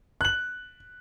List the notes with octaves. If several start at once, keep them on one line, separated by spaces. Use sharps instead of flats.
F#6 F#7